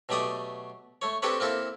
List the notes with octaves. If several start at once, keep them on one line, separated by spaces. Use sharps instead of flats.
B2 F#3 A3 G4 D5 D#6
A3 C#5
C4 D4 G4 A4 B4 C#5
A#3 C4 E4 A4